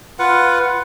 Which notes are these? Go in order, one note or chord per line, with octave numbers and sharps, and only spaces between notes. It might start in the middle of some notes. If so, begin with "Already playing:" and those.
F4 B4 F#5